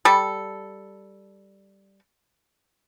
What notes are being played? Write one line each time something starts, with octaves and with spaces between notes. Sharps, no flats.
G3 A4